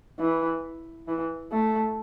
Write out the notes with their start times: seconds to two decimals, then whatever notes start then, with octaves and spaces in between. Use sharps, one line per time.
0.20 E3
1.08 E3
1.52 A3